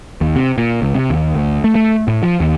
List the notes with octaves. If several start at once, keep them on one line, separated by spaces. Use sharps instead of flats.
D#2
C3
A#2
C#2
C3
D#2
D2
A3
A3
A2
F3
D#2